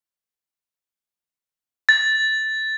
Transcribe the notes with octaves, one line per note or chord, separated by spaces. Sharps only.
A6